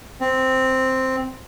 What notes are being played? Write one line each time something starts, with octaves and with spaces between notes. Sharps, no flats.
C4